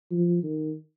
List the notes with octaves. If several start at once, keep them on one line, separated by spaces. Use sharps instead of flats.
F3
D#3